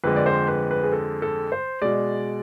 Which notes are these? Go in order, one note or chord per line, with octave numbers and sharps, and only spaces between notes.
F2 D3 G#3 B4
D5
C5
B4
B4
G#4
A4
A4
C5
B2 G#3 D5